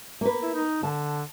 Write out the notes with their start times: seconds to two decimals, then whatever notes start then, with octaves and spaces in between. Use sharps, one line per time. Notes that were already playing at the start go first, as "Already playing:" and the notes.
0.21 A#3 B4
0.43 E4
0.54 D#4
0.83 D3 A5